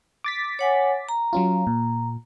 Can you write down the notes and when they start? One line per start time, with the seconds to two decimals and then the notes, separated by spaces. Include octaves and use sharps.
0.24 D6 A6 B6
0.59 C#5 F#5 G#5
1.09 A#5
1.33 F#3 C#4 F4
1.67 A#2